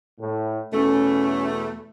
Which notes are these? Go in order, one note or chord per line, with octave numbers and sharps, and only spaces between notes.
A2
E2 B2 A3 C#4